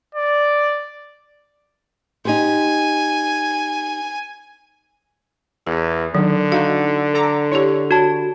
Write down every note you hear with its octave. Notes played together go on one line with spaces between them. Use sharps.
D5
D#4 G4 C5 G#5
E2 G#4
D3 D#3 F#3
D#4 F#4 F5
A4 A#5 D6
E4 G4 C#5
F#4 A5